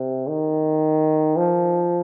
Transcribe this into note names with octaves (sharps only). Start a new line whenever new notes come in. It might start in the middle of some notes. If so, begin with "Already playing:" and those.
Already playing: C3
D#3
F3